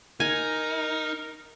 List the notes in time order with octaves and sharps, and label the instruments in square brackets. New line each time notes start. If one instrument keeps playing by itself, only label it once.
[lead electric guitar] D#4 [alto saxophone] A#4 [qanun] G#5